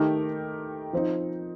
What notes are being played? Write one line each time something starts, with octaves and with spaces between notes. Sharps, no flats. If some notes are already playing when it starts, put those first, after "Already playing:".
Already playing: D#3 A3 D#4 G4 A#4
F3 C4 D#4